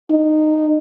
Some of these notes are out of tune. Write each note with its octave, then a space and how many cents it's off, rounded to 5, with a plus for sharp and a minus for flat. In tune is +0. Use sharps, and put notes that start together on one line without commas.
D#4 -15